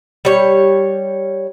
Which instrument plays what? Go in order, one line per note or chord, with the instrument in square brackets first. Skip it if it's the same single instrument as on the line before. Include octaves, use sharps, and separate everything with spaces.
[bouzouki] G3 C#5